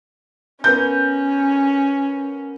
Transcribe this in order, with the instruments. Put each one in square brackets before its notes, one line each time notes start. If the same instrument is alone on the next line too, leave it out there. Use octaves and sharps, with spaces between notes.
[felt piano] B3 A#4 G6 [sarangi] C#4